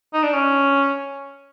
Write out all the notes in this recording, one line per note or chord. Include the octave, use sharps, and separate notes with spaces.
D#4
D4
C#4